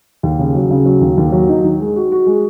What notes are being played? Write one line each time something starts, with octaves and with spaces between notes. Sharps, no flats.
D#2
C#3
F#3
C#3
F#3
D#2
D#2
F#3
D#4
D#3
G#3
F#4
F#4
G#3